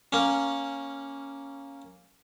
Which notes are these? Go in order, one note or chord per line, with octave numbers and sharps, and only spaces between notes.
A#3 C#4